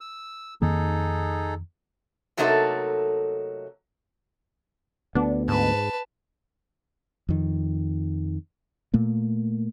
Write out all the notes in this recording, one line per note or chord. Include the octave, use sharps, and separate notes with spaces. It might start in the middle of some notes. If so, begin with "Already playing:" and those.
E6
F2 D#3 A#3 D#4 G#4 A4
C3 F#3 A3 A#3 D#4 A4
D2 B3 D4
G#2 B4 A5
F2 D#3
A#2 A3 A#3